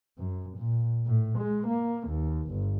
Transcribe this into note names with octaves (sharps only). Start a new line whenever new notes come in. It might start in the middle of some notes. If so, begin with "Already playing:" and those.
F#2
A#2
A2
G#3
A#3
D#2
G1